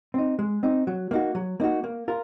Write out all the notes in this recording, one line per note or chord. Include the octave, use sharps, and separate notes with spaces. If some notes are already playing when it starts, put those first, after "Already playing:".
C4 D#4
G#3
C4 D#4
F#3
A#3 D#4 F#4
F#3
A#3 D#4 F#4
A#3
F4 A#4